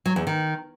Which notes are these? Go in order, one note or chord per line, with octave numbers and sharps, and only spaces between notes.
F#3
E2
D#3